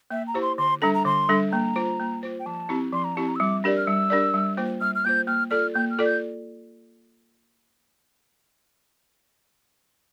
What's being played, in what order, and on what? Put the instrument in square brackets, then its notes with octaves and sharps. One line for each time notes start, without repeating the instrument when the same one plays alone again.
[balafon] A#3 [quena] E5
[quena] A#5
[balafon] E4 G4 C5
[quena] C6
[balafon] D3 [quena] C6
[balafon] G3 D4 A4 [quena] A#5
[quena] A#5
[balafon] D3 [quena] C6
[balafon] G3 D4 A4
[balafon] A#3 [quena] A#5
[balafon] F4 C5
A#3
F4 C5
[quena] G5
[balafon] F3 [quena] A5
[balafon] C4 E4 G4
[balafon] F3 [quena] C6
[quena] A#5
[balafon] C4 E4 G4 [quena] A5
[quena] A#5
E6
[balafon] G3 [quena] D6
[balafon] D4 G4 A#4 D5
[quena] F6
[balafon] G3 [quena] E6
[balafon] D4 G4 A#4 D5
G3
A#3 F4 C5
[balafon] G3 [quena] F6
[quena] F6
[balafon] A#3 F4 C5 [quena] G6
[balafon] A#3 [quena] F6
[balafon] F4 A4 D5 [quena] F6
[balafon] A#3 [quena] G6
[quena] F6
[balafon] F4 A4 D5
[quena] G6